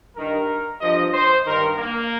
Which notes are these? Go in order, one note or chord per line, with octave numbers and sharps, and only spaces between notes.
G2 D#3 A#4
G2 F3 D#5
C5
G2 D#3 A#4
A#3